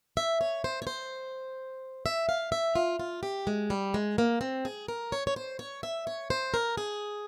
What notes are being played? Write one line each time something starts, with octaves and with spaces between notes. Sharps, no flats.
E5
C#5
C5
C#5
C5
E5
F5
E5
F4
F4
G4
G#3
G3
G#3
A#3
C4
G#4
A#4
C#5
C#5
C5
C#5
E5
C#5
C5
A#4
G#4